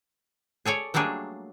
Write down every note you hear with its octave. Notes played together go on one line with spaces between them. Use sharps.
G#4 A4 C#5 D5
F#3 G3 A3 A#3 D4 G#4